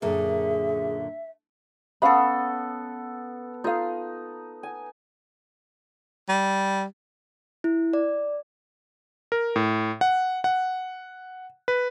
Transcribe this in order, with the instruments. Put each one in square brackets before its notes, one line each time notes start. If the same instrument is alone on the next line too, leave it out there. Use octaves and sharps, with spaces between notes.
[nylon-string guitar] F#2 A#2 D3 [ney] G#4 [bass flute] E5
[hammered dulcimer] B3 A4 [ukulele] C#4 F5 B5
[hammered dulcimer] D#4 [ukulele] F4 A4 F5
[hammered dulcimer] G#5
[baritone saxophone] G3
[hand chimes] E4
D5
[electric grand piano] A#4
A2
F#5
F#5
B4